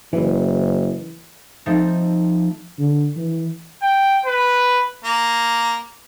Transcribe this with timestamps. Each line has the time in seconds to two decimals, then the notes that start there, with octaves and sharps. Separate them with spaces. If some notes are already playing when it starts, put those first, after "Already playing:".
0.13 F#1 E3
1.66 F3 A3 C4 D#4
2.79 D3
3.17 E3
3.83 G5
4.25 B4
5.04 A#3